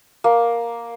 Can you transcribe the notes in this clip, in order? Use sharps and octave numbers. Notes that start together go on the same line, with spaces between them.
A#3